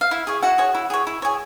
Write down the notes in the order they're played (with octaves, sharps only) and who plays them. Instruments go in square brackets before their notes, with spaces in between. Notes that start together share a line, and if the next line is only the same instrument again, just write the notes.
[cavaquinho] F5
E4 E5
G#4 C#5
E4 F#4 F#5
G#4 C#5
E4
G#4 C#5
E4
G#4 C#5